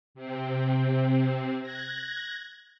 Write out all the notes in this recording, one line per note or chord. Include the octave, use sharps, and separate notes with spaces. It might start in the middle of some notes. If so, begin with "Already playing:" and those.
C3 C4
F#6 G#6 A#6